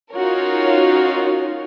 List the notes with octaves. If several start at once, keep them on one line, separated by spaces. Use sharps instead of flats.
C#4 D#4 F4 F#4 A#4 C#5